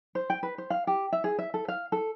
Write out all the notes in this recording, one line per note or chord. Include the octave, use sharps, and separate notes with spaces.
C5
G5
B4
C5
F5
G4
E5
G#4
E5
A4
F5
A4